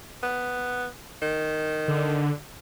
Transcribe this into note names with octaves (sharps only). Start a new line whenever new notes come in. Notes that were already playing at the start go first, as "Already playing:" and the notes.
B3
D#3
D3